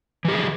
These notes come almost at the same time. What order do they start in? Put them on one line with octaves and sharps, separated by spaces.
E3 G4 G#4